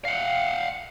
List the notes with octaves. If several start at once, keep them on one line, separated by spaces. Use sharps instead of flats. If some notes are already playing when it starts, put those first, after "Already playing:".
F5 F#5